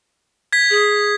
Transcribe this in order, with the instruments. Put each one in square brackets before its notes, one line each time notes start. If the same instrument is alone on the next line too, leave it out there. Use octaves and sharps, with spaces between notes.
[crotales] G#6 B6
[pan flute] G#4